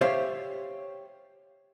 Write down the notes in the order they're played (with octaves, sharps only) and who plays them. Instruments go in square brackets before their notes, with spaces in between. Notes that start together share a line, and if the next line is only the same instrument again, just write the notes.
[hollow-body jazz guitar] G4 C5 C#5 E5 F5